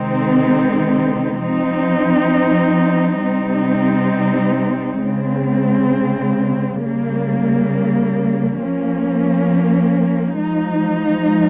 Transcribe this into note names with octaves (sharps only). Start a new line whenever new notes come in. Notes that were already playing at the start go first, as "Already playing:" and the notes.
Already playing: C3 D#3 G#3 C4 D#4
F3 C4 D#4
C3 G3 C4 D#4
C#3 G#3 C4
C#3 G3 A#3
F3 A#3 C#4
F3 G#3 D#4